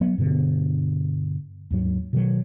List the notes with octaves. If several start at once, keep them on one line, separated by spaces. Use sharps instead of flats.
F#3 B3
G2 B2 D3 B3
D#2 G#2 F#3
B2 D#3 E3 F#3